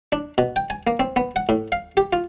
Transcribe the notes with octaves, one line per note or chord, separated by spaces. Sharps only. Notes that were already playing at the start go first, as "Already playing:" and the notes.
D4
B2
G5
G#5
A#3
C4
B3
F#5
A2
F5
G4
F4